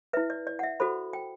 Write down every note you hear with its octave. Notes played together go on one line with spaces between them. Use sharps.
E4 B4 E5
D5
D5
F#5
E5
F#4 A4 C5 B5
G5